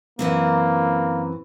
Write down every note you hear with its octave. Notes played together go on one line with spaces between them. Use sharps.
F#2 E3 A#3 C4